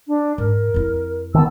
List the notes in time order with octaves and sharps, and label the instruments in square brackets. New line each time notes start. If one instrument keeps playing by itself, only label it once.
[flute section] D4
[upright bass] G#2 [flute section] A#4
[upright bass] F2 E4
[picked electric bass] D#3 E3 B3 [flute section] A5 E6